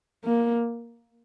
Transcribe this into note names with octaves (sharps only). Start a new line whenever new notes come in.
A#3